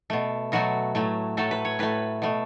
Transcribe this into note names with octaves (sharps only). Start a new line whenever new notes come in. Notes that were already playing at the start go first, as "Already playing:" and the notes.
B2 A3
B2 F#3 A3 F#4
A2 F#3 A3
A2 F#3 A3 A4
B4
C#5
A2 A3 B4
B2 A3